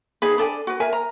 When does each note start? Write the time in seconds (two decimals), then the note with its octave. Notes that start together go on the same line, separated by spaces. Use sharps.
0.22 D#4 G#4 B4
0.38 D4 A4 D5 G#5
0.67 F#4 B4
0.80 A#4 E5 G#5
0.93 A#5